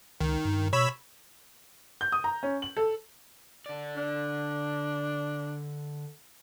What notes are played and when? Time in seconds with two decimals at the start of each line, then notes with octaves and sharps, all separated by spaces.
0.21 C#2 D#3
0.45 G2
0.73 B2 C#5 B5 E6
2.01 G6
2.12 D#6
2.24 A#5
2.43 C#4
2.62 F#7
2.77 A4
3.66 D3 D5
3.97 D4